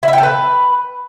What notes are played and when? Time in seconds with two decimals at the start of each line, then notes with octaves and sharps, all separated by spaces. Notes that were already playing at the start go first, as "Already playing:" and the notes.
0.03 E4
0.08 E5
0.13 G5
0.18 A4
0.23 B4